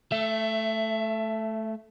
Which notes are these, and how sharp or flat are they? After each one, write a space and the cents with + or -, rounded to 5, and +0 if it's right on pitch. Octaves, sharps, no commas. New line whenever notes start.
A3 -5 E5 +20